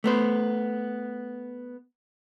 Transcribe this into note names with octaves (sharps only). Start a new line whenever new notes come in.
A3 B3 C5